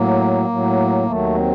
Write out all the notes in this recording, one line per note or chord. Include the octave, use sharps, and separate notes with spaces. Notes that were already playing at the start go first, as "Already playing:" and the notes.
Already playing: A2 F#3 A#3
A2 F#3
D#2 D#3 F#3 A3
C4